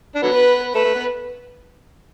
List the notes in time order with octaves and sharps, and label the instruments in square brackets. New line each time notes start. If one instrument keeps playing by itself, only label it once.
[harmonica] D4
D3 F#3 B3
[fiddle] B4
[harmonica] A3 [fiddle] B4
[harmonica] A3
B3